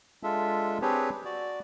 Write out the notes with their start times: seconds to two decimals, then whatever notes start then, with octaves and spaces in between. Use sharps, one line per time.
0.23 G#3 D4 F4 A4 E5
0.82 C4 D4 G4 G#4 B4 C#5
1.25 F#4 D5